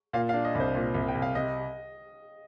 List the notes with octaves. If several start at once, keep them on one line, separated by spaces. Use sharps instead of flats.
A#2 F5
F5
D4
D#5
C2 C5
A#2
C2
G5
C2
F5
C3 D#5